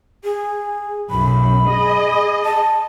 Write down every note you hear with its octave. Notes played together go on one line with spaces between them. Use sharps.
G#4
B1 F#2 B5
G#4 D#5
A5